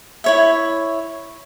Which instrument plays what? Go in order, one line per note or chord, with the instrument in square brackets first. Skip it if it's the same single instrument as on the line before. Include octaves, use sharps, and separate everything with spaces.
[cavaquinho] E4 C#5 E5